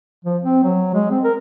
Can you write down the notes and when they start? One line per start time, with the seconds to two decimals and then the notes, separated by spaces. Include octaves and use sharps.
0.24 F3
0.42 C4
0.63 F#3
0.94 G#3
1.10 C4
1.24 A#4